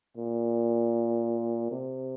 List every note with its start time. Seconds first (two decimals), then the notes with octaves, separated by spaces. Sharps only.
0.17 A#2
1.71 C3